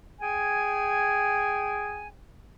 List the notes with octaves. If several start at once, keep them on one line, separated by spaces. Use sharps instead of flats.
G#4 G5 G#5